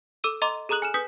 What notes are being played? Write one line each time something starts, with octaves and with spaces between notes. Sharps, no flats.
A4 D6 E6 D#7
D#5 A#5 C6 D6
G#4 A4 A#5 D#6 F#6 F#7
G#5 F6 E7
B4 G#5 D#6 G6 B6